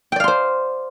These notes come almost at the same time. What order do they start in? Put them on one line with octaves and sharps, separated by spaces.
G5 D5 F5 C6 C5